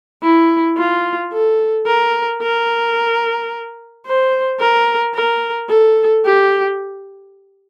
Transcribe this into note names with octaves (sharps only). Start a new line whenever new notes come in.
E4
F4
A4
A#4
A#4
C5
A#4
A#4
A4
G4